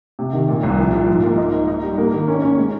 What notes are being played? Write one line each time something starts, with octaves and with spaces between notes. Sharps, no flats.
C3
D#3
A#2
C2
F3
F3
G#2
A#3
D#4
D#4
D#4
G3
A#3
D#3
C#4
C#4
G#3